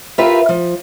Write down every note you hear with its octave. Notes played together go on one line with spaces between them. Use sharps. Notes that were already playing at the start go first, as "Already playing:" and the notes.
F4 G4 A#4 B4 E5 F5
F3